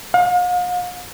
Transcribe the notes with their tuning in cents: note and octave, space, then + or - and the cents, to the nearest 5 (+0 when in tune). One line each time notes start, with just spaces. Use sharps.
F5 +45